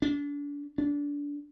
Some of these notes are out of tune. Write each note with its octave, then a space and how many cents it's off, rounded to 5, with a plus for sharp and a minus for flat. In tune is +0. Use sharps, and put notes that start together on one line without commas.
D4 -35
D4 -25